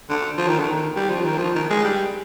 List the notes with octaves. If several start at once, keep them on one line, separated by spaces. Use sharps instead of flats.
D3
F3
D#3
D3
D#3
G3
F3
D#3
F3
D#3
G#3
G3